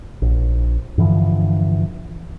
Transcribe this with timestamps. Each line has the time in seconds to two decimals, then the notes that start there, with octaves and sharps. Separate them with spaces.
0.22 A#1
0.98 G2 D3 E3 F3